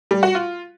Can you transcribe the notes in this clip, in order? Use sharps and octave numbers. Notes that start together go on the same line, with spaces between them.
G3
F#4
F4